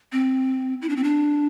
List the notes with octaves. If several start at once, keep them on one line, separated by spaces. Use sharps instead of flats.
C4
E4
D4
C4
D4